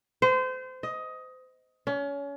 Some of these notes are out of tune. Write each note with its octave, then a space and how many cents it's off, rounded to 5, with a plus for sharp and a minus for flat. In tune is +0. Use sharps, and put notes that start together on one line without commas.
C5 -30
D#5 +15
C#4 +30